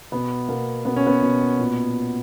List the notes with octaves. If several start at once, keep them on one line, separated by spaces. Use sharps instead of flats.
B2 B3
B2 A#3
B2 B3
C#4
B3
B2
A#2